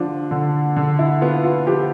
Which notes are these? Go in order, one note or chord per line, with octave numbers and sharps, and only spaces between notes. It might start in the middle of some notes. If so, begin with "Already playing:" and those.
Already playing: D3 F3 D4 F4
D3
D3
E4
B3 F4
F4
F3 G4